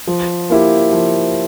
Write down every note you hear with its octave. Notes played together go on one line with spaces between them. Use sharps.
F3
A#3 E4 G4
F3